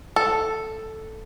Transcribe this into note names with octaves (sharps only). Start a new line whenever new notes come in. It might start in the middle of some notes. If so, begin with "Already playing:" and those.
A4